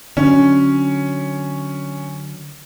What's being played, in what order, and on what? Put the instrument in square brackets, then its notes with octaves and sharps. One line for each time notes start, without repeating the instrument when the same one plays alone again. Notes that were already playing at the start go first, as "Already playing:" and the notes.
[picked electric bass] D3 F#3 [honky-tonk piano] C#4